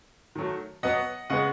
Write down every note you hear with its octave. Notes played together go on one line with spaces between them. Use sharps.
D#3 F#3 A3
B2 F#3 B3 D#5 F#5
C#3 G#3 B3 D#5 F#5